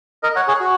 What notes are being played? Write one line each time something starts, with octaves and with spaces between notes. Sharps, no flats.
A#4 D#5
C#5 F#5
G#4 C#5
F#4